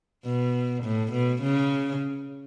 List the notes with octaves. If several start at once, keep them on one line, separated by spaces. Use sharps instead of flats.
B2
A2
B2
C#3